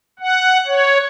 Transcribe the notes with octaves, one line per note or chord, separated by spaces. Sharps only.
F#5
C#5